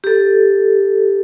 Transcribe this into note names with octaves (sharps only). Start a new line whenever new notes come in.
G4 A4